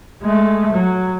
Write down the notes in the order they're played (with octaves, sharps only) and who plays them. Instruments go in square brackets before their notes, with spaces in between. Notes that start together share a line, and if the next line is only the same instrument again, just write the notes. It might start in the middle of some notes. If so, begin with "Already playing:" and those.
[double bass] G#3 A3
F#3